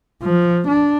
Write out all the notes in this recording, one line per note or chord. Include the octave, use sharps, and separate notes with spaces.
F3
D4